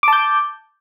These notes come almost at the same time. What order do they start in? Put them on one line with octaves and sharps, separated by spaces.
D6 A5 G6